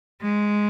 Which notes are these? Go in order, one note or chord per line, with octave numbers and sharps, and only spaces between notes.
G#3